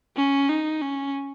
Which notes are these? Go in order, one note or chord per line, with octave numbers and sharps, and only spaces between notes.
C#4
D#4
C#4